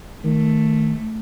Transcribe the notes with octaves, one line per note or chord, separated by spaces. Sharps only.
D#3 A3